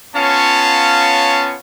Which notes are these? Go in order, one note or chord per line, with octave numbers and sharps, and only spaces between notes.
B3 C#4 F4 C#5 F5 A5